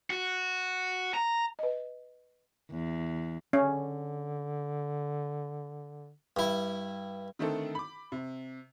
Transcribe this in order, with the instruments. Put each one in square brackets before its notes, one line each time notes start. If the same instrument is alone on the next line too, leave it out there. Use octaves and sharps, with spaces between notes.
[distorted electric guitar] F#4
A#5
[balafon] B4 D#5
[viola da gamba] E2
[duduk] D3 [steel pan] C#4
[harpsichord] G2 E4
[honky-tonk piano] D3 D#3 A3 C4 A4
B5 D6
C3